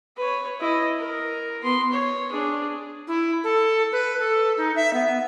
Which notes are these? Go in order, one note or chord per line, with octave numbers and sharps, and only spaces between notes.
B4 C#5
E4 D#5
A#4
B3 C6
C#5
D4 G#4
E4
A4
B4
A4
D#4
E5
B3